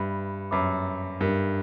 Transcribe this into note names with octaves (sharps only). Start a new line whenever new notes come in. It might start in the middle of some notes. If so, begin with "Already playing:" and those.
Already playing: G2 B4 E5 B5
F#2 B4 E5 B5 D6
G2 D4 A#4 E5